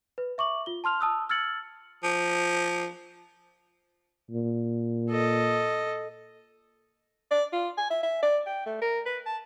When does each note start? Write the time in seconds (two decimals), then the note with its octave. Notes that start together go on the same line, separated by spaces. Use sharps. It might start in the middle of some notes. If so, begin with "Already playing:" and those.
0.18 B4
0.38 E5 C#6 D6 F#7
0.66 F4 G7
0.84 A5 C6 F6 F7
1.00 A5 D#6 E6 F#6
1.29 E6 F6 G#6 A6 C#7 F#7
2.03 F3
4.31 A#2
5.10 A4 D#5
7.31 D5
7.53 F4
7.78 G#5
7.90 E5
8.03 E5
8.22 D5
8.46 G5
8.66 A3
8.82 A#4
9.06 B4
9.26 A5